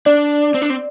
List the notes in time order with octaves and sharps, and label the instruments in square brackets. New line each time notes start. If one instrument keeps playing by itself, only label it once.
[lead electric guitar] D4 [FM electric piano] D5
[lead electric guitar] C4
D4
C4